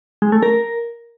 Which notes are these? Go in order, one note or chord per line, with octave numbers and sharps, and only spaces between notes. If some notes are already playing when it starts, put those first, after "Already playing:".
G#3
A3
A#4